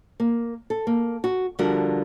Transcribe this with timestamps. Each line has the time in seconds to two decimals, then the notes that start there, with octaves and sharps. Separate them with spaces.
0.20 A#3
0.70 A4
0.87 A#3
1.24 F#4
1.59 D3 F3 G3 F#4 A#4